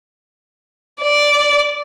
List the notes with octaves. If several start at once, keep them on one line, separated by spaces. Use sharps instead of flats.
D5